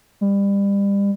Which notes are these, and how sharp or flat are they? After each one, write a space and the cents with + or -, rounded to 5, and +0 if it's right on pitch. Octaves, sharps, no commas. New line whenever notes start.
G3 +30